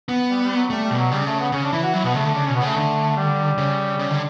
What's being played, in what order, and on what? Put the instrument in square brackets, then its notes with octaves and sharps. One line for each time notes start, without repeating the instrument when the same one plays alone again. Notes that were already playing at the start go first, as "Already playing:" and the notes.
[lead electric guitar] B3
[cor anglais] G3
G3
F#3
[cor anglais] G3 [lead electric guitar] A3
[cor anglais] G3
[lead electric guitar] B2
[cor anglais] F#3
[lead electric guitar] C#3 [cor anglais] G3
[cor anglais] A3
B3
[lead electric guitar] C#3 [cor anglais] C#4
[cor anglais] D4
[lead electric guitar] E3 [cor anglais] E4
[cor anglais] F#4
[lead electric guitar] F#3 [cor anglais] E4
[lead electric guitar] B2 [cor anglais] B3
[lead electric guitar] C#3 [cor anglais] A3
[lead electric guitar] D3 [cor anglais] A3
[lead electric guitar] C#3 [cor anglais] D4
[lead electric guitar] B2 [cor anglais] C#4
[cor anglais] B3
[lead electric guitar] C#3 [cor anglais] A3
[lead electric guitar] D3
[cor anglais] G3
[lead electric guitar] C#3
C#3
D3